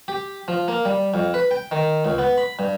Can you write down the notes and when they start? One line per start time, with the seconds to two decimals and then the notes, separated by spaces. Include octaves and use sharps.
0.08 G4
0.48 F3
0.68 A#3
0.85 G3
1.14 F2
1.34 B4
1.51 G5
1.71 D#3
2.05 C#2
2.18 B3
2.38 B5
2.59 G2